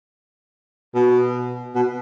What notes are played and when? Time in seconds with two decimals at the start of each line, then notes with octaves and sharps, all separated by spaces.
0.95 B2
1.75 B2